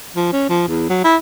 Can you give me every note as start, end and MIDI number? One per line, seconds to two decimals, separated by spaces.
0.16 0.28 53
0.33 0.45 61
0.49 0.65 53
0.68 0.86 40
0.89 1.03 54
1.04 1.16 64